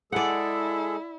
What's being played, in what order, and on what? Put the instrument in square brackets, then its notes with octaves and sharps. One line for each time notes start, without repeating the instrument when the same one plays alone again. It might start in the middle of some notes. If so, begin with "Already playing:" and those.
[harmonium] G#3 G#4 A4 [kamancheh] E4 [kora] D5 F#5